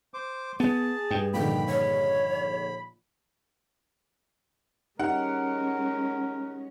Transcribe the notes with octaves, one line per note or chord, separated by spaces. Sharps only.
C5 D6
B3 G#4 A5
G2 G5
A#1 D3 D#3 G5 B5
C#5
G#3 C#4 D#4 G4 A#4 F#5